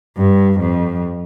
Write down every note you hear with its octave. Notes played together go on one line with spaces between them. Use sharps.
G2
F2